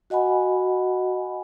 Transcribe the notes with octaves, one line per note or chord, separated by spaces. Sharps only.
F#4 D#5 F#5 G#5 B5